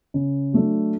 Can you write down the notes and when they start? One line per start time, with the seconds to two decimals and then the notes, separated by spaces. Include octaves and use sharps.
0.14 C#3
0.53 F#3 A3 D4